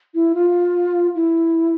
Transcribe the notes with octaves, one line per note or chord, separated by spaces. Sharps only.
E4
F4
E4